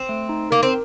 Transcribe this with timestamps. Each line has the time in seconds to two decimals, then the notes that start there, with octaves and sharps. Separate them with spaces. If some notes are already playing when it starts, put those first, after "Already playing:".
Already playing: C4
0.09 A3
0.29 D#4
0.51 A#3 A#4
0.63 C4